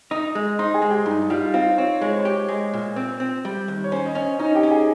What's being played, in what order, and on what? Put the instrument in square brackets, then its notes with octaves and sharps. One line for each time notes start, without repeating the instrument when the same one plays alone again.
[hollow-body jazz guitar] D#4 [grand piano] D#5 D#6
[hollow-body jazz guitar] G#3
[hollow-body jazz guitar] D#4 [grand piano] C5 C6
[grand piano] G#4 G#5
[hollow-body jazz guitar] G#3
[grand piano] G4 G5
[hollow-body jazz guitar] G2 [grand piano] D#4 D#5
[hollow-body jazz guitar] G3 [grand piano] F4 F5
[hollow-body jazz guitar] C4 [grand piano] F4 F5
[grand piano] C5
[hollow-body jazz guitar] C4 [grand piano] C#5
[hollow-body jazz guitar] G#3 [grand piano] C#5
[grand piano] C5
C#5
[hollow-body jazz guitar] G4
G#3
A#2
C4
C4
G3
D#2
[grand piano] C#5
[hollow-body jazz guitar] C#4 [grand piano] C5
[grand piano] D#5
[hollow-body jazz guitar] C#4 [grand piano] C#5
[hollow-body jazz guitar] C#4 [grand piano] D#4 D#5
[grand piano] G4 G5
[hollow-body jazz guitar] C#4
[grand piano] G#4 G#5